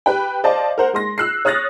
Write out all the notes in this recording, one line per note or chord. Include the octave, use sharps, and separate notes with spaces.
G4 B4 G5
C5 D5 D#5 F5 A5
A#4 C5 F#5
G#3 C6 A#6
E6 F#6 C7
C#5 D#6 F6 F#6 A6 A#6